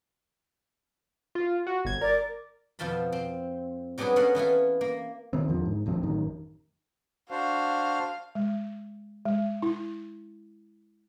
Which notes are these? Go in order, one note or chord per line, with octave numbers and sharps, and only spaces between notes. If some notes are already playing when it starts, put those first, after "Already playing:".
F4
F#4
G1 G#6
A#4 D5
F2 B2 F3 F4 A5 B5
C4
F#3 G3 B3 D4 G#4 B4
B3 C#4 A4 A#4 F5 F#5
E3 B3 E4 F4
A#3
D#3 B3 C4
E2 D3 F3
G#2
D#1 D2 F3 C4
A1 F#2 D#3
D4 F#4 C5 F5
G#3
G#3
E4